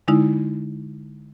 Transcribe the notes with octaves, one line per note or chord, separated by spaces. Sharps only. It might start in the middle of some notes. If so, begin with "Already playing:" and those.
D3 G#3 D#4 E4